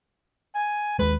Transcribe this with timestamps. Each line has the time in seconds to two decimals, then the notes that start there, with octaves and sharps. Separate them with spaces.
0.55 G#5
0.99 D#2 G#3 B4